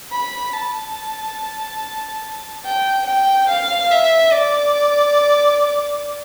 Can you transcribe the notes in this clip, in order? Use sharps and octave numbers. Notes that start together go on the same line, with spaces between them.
B5
A5
G5
G5
F5
E5
D5